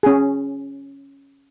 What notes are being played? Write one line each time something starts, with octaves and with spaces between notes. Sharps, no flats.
C#4 G#4